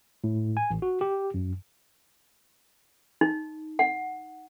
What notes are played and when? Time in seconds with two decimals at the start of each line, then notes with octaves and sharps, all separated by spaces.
0.24 A2
0.57 G#5
0.70 A1
0.82 F#4
1.01 G4
1.34 F#2
3.21 D#4
3.79 F#5